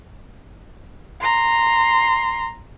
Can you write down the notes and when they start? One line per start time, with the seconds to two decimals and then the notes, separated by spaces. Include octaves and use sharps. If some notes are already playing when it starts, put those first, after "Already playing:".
1.21 A#5 C6